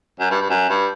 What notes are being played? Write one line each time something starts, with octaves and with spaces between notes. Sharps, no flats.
F#2
G2
G2
F#2
G2